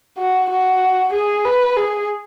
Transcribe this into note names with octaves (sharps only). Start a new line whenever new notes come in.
F#4
F#4
G#4
B4
G#4